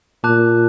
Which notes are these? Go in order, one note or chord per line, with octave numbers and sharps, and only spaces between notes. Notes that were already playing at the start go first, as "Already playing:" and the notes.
A#2 A5 D6 F#6